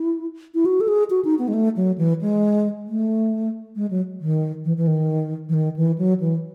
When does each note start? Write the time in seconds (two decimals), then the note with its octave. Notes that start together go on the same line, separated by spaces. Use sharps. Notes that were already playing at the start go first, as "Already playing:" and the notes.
Already playing: E4
0.54 E4
0.65 F#4
0.81 A4
0.88 G#4
1.10 F#4
1.25 D#4
1.39 B3
1.48 G#3
1.54 A3
1.76 F#3
1.98 E3
2.21 G#3
2.87 A3
3.76 G#3
3.90 F#3
4.21 D#3
4.65 E3
4.77 E3
4.87 D#3
5.49 E3
5.54 D#3
5.76 E3
5.98 F#3
6.20 E3